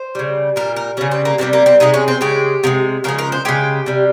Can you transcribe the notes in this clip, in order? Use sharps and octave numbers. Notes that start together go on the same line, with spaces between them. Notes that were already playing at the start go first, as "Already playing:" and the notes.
Already playing: C5
C#3 G3
A#2 G3 A#4
A#4
C#3 G3 C#4
C4
A#3
C3 D#3 G3 C4
A#3
C4
C3 D#3 G#3 D#4
C#4
C4
C#3 G#3 G4
C3 F3 G#3
C#3 F3 G#3 A#4
A#4
C5
C#3 G#3 G4
C3 G3